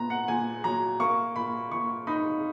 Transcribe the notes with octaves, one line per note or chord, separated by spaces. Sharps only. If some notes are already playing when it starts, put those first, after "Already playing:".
Already playing: A#2 B3 A#5
F#5
A#2 G#5
F#3 A#5
A#3 C#6
A#2 B5
A#2 C#6
D#4 B5